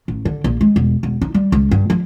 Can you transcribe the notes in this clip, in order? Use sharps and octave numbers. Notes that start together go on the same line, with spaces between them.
A1
D3
A#1
G#3
E1
E1
D#4
G3
C#2
G2
F3